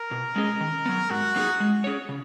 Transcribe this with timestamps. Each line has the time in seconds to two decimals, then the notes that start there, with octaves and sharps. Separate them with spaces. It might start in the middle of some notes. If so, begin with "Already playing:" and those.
Already playing: A#4
0.11 B2
0.36 G#3 C#4 G#4 D#5
0.60 D#3
0.86 F#3 B3
1.10 G#2 F#4
1.36 F#3 A#3 D#4 G#4
1.60 G#3
1.84 C#4 G#4 C#5
2.09 C#3